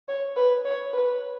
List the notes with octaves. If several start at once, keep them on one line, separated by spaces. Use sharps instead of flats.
C#5
B4
C#5
B4